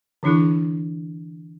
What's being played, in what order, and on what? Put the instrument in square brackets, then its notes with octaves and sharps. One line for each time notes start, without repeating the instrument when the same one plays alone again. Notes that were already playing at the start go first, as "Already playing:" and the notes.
[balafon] D3 E3 D4 E4 G#4